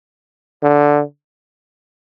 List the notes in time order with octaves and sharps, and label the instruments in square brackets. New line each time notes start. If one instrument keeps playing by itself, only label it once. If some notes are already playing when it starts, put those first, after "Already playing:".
[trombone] D3